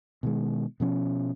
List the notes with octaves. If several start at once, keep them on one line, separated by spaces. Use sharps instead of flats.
B2 D#3 G#3
B2 F3 C#4